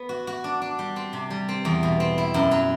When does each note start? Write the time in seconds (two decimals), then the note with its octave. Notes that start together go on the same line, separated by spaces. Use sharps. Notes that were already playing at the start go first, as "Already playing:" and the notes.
Already playing: B3
0.09 F#4
0.27 F#4
0.44 D4
0.62 D4
0.79 G3
0.96 C4
1.13 C3
1.30 G3
1.49 C4
1.65 E2
1.83 B2
2.00 C4
2.18 E4
2.34 F#2
2.51 F#3